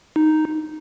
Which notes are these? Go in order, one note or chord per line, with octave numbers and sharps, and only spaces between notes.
D#4